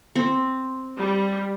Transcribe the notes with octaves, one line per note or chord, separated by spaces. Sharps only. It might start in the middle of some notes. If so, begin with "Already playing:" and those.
C4
G3